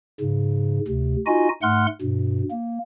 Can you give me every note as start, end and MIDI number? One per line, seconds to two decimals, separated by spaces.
0.20 0.80 44
0.20 0.80 49
0.88 1.16 38
0.88 1.16 48
1.26 1.49 63
1.26 1.49 65
1.26 1.49 66
1.26 1.49 75
1.26 1.49 80
1.62 1.86 44
1.62 1.86 57
1.62 1.86 78
1.62 1.86 84
1.62 1.86 89
1.62 1.86 90
2.01 2.43 43
2.01 2.43 47
2.51 2.79 58